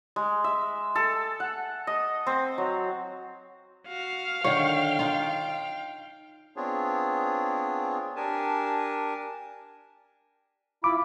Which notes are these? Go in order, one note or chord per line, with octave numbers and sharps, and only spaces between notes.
G#3
E5
A4
F#5
D#5
C4
F#3
F#4 F5
D3 D#3 C#5 G5
D#4 F4
B3 C4 D4 F4 G#4 C#5
D4 G4 A#4 G#5 A5
E4 F4 B5 D6